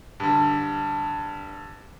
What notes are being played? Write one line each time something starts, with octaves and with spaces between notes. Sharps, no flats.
G2 D3